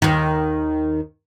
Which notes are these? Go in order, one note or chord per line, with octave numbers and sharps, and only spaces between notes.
D#2 D#3